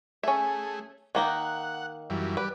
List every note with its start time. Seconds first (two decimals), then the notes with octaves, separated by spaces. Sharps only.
0.23 A3 C#4 G#4 E5
1.15 D#3 A#3 D#4 F#5
2.10 F#2 E3 G3
2.37 G3 B4 D5